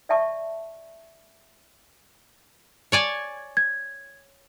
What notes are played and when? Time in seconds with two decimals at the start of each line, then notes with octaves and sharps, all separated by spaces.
0.09 D5 E5 A5 C#6
2.92 C#5 D5 G#5
3.57 G#6